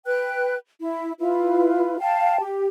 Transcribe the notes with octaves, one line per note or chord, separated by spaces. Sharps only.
B4 G5 F#6
E4
E4 F4 B4
F5 G5 A5
G4